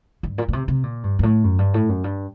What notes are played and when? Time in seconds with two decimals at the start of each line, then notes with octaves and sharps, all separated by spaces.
0.23 G2
0.38 A#2
0.48 A#2
0.53 C3
0.68 C3
0.83 A#2
1.04 G2
1.19 G2
1.23 A2
1.44 F#2
1.59 G2
1.74 A2
1.89 F#2
2.04 G2